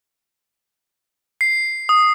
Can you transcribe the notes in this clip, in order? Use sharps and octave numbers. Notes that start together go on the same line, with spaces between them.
C7
D#6